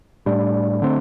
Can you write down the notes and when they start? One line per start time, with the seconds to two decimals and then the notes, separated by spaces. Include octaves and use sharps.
0.26 A2 G3 D4
0.82 D3 A3 C4